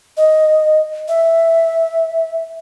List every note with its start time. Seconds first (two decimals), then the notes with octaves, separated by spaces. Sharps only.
0.17 D#5
1.08 E5